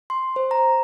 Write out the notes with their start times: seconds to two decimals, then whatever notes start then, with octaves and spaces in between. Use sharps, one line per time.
0.10 C6
0.36 C5
0.51 A#5